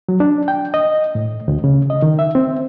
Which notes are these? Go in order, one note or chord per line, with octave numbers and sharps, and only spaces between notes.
F#3
D4
G5
D#5
A2
D2
C#3
D#5
D#3
E5
C4